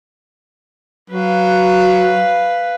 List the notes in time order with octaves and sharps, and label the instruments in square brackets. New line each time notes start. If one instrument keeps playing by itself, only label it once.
[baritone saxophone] F#3 [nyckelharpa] B4 F5